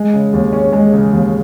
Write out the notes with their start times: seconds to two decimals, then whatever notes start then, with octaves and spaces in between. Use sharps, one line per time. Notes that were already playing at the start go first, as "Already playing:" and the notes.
Already playing: G#3
0.13 C#3
0.33 D#2
0.53 C#4
0.73 G#3
0.93 C#3
1.13 D#2